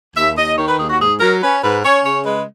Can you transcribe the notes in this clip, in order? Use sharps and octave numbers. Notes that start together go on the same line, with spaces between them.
D#2 E5
D#2 D#5
D#3 C#5
B4
D#2 G#4
F#4
G#2 G#4
F#3 A#4
C#4 B4
G#2 B4
C#4 C#5
C#3 C#5
G#3 B4